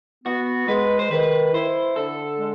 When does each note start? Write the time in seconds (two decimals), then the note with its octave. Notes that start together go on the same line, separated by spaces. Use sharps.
0.25 B3 F#4
0.68 G#3 B4
0.99 C5
1.11 D#3 B4
1.54 E4 C5
1.96 D3 A4
2.39 G#3